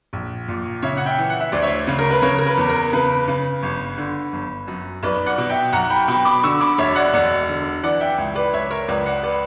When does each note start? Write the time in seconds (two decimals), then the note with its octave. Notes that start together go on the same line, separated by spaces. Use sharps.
0.13 A#1
0.48 A#2
0.82 C#3 C#5 E5
0.97 F#5
1.06 E5 G5
1.18 E3
1.30 F#5
1.40 E5
1.52 D2 D5
1.62 C#5 E5
1.87 C#3
1.99 A#4
2.11 B4
2.22 C#3 A#4 C#5
2.38 A#4
2.46 B4
2.57 E2
2.69 A#4
2.93 C#3 B4
3.28 C#3
3.63 G1
3.98 D3
4.33 G1
4.67 F#2
5.03 B1 B4 D5
5.26 D5 F#5
5.38 B2
5.50 E5 G5
5.72 B1 F#5 A#5
5.90 G5 B5
6.08 B2 G5 B5
6.25 B5 D6
6.43 D3 C#6 E6
6.60 B5 D6
6.78 E1 C#5 E5
6.95 D5 F#5
7.13 E1 D5 F#5
7.49 D3
7.83 E3 D5 F#5
8.00 E5 G5
8.18 C#2
8.35 B4 D5
8.53 C#2 C#5 E5
8.70 A#4 C#5
8.88 C#2 B4 D5
9.06 D5 F#5
9.23 B4 D5